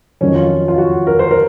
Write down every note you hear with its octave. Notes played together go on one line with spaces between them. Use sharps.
F2 D#3 F#3 C#4
F4
F4
F#4
A#4
C5
A#4